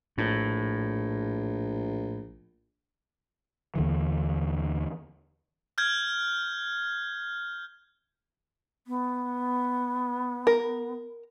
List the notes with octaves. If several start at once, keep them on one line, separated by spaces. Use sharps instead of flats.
A#1 A2
D#2 D3 E3
F6 G6 G#6
B3
A#4